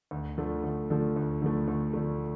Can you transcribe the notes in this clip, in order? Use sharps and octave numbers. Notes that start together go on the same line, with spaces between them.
D2
D3 F3 A3
D2
D3 F3 A3
D2
D3 F3 A3
D2
D3 F3 A3